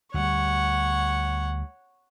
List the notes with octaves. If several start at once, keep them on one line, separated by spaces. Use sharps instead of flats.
D2 G3 C#5 F#5